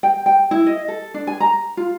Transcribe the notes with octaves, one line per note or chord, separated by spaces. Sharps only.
G5
G5
E4
D#5
A4
D4
G#5
A#5
F4